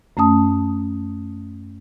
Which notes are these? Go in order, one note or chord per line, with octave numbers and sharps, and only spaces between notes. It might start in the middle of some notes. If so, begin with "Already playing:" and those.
F#2 A3 C#4 A5 D#6